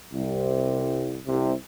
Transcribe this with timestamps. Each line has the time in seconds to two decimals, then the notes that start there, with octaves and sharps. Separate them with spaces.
0.13 C2 C3
1.27 C2 C3